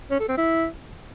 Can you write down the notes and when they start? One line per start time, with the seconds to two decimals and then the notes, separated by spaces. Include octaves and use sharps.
0.11 C#4
0.20 A4
0.28 C4
0.37 E4